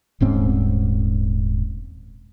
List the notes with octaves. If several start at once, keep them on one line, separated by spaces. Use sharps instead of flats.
D#1 G#2 C4 C#4